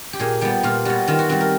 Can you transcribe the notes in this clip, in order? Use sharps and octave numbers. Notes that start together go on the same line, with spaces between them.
G4
A#2 G#4
G3 B3 G4
A#2 F4
G3 B3 F#4
D#3 F4
F#4
G3 C4 F#4
A#4